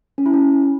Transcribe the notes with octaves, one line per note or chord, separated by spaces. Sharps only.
C#4
E4
C#4